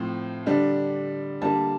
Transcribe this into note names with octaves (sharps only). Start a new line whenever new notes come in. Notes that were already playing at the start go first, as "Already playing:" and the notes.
Already playing: A2 F3 C4
D3 G3 D4
D3 G3 A#3 A5